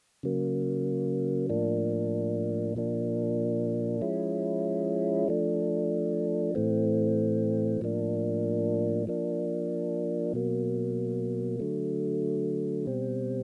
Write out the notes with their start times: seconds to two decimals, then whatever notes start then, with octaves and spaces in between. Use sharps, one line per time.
0.23 C#3 F#3 A#3
1.50 A2 F3 A#3 D4
2.75 A#2 F3 A#3 D4
4.01 F3 G#3 C#4 E4
5.28 F3 A3 D4
6.55 A2 E3 A3 C4
7.81 A2 F3 A#3 D4
9.07 F3 A#3 D4
10.34 B2 F#3 A#3
11.59 D3 F#3 A3
12.86 B2 G3 C4